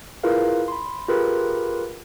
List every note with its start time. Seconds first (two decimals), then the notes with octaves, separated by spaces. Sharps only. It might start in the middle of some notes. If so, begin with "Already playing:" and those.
0.23 E4 F4 G#4 A#4 B4 F5
0.68 B5 C6
1.08 F4 G4 G#4 A#4 B4 B5